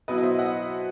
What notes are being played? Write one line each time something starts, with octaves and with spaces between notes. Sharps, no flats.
B2 F#3 B3 E4 B4 D#5
D#5
C5 E5
D#5 F#5